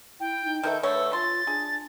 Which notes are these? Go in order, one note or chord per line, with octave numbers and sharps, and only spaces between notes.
E4 G5
D#4
D#3 A4 B4 E5 G6
D3 A3 C#5 E6
F4 C6 A6
D4 G#4